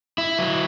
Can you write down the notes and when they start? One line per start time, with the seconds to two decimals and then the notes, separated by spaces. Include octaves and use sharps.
0.18 E4
0.39 F#3